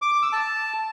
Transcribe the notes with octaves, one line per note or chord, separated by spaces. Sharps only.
D6
D6
E6
A5